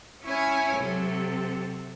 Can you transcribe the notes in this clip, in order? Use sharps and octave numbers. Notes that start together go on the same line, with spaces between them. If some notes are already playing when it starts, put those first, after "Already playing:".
C#4 E4 C#5 G#5 C#6
C3 F#3 A4